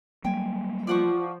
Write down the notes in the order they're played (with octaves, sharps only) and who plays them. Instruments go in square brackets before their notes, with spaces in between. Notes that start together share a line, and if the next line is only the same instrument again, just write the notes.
[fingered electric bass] F#3 G3 A#3 [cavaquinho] G5 G#5
[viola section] F3 [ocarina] F4 [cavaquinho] D5 F#5 C#6